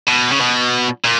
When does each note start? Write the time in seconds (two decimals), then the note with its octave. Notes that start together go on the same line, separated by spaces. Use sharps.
0.07 B2
0.31 C#3
0.40 B2
1.05 A#2